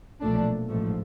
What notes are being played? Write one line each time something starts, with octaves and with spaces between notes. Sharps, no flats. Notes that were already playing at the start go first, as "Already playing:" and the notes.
B1 A#2 F3 A3 D4
A1 G#2 F3 A3